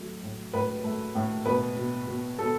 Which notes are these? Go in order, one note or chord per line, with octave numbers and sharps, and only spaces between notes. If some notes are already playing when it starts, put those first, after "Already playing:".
Already playing: F#3 A3
A2
A2 B4
A3
A2
B2 B4
B2
B2
B2 A4